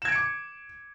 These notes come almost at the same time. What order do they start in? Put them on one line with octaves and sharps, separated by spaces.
E7 G#6 D7 C#7 D6